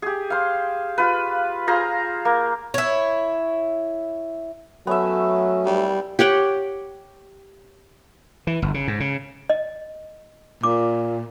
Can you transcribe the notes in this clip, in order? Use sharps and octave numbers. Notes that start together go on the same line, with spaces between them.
G4 G#4
C5 F5
F4 B4
F4 G#4 C5 A#5
A#3
E4 C#5
F#3 A3 B3 C#4 E5
G3
G4 C#5 F#5 G5
E3
G1
C#3
G#2
C#3
D#5
A#2 D6